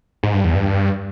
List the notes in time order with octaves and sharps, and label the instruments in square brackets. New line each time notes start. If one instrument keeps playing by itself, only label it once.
[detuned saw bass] G#2
G2
E2
G2